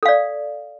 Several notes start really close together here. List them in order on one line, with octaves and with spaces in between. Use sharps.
A4 F5 D5